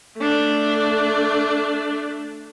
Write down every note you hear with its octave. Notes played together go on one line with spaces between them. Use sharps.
A3 D4